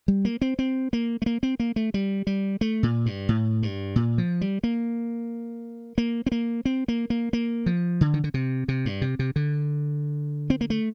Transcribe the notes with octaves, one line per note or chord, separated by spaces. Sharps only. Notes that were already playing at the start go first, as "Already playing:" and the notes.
G3
A#3
C4
C4
A#3
A3
A#3
C4
A#3
A3
G3
G3
A3
A#2
G2
A2
G2
A#2
F3
G3
A#3
A#3
C4
A#3
C4
A#3
A#3
A#3
F3
D3
D#3
D3
C3
C3
G2
C3
C3
D3
C4
A#3
A3